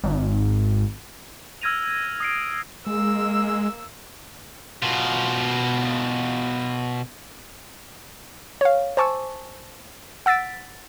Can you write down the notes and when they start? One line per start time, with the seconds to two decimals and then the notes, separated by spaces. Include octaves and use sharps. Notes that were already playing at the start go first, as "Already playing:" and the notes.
0.03 G#1
1.62 E6 F6 G#6 A#6 D#7 F7
2.20 D#6 C7 D7
2.87 G#3 A#3 E6
4.83 B2 F4
8.61 C#5 F5
8.97 C5 G#5 A5 C#6 D6 E6
10.26 F#5 E6 A6 B6 D7